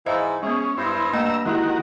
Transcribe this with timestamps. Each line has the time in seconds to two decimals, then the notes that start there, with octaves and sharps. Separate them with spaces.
0.06 G#2 E3 E4 C5 D#5 F5
0.43 G#3 B3 C#4 G#4
0.78 G2 E4 C5
1.13 A3 A#3 D#5 A#5 E6
1.45 D#3 G#3 E4 F#4 G4 A#4